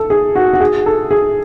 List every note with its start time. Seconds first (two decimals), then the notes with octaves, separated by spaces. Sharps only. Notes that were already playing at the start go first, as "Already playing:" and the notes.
Already playing: A4
0.10 G#4
0.35 F#4
0.53 F#4
0.60 G#4
0.86 A4
1.11 G#4